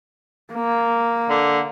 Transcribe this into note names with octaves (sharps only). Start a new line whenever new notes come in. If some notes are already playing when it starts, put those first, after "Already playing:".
A#3
D3